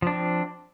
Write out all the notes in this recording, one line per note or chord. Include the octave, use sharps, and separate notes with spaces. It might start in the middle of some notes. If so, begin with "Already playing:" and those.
F3 C4 D4